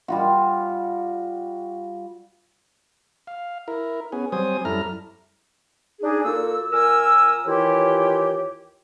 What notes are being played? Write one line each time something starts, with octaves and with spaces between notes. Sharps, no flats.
G3 F4 F#4
F5
E4 A#4
B3 C#4 G#4
F#3 G3 C4 C5 G#5 D#6
F#2 G3 E4 A4 A#5 F6
D4 D#4 G#4
A#2 A#3 F#4 A4 E6
A#2 A#4 G#5 E6
D#2 E3 E4 F4 G4 C#5